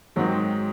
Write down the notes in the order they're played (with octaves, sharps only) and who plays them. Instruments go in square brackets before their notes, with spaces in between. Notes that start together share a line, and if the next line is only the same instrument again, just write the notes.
[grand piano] G#2 D#3 G#3 C4 D#4 [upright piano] F#3